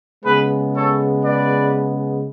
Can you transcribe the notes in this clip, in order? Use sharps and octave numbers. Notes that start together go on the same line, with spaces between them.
C#3 G#3 B3 G#4 B4
A4 C#5
B4 D5